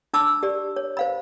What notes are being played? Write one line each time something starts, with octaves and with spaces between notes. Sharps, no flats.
D4 A5 B5 D6 E6
G4 D5
C#5
C5 F5 B5